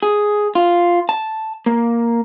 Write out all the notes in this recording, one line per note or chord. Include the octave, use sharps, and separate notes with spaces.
G#4
F4
A5
A#3